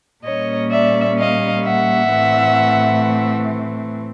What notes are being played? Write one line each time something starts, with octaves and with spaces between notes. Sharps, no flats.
A#2 G3 A#3 C#4 C#5 D#5
D5 E5
D#5 F5
E5 F#5
A2 E3 A3 C4